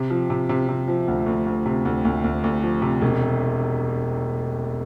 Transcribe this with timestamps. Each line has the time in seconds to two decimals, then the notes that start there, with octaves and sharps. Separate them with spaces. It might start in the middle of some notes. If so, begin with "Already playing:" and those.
Already playing: C3
0.10 F3
0.30 C3
0.49 C3
0.69 C3
0.88 F3
1.08 D2
1.26 D2
1.46 D2
1.66 C3
1.85 D2
2.05 D2
2.24 D2
2.44 D2
2.62 F3
2.82 C3
3.02 E1